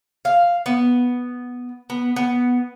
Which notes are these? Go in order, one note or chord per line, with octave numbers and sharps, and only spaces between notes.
F5
B3
B3
B3